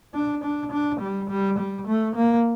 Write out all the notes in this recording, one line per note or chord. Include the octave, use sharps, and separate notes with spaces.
D4
D4
D4
G3
G3
G3
A3
A#3